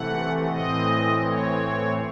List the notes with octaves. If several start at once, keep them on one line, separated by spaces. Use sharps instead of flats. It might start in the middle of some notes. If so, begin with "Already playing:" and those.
Already playing: C3 E3 A3 F#5
A2 E3 C4 D#5
C#5